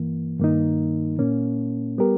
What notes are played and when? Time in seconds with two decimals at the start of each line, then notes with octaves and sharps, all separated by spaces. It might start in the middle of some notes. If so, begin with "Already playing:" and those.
Already playing: G2 E3 A#3
0.40 G2 D#3 A#3 D#4
1.19 A#2 A#3 C#4
1.98 G3 B3 G4 A#4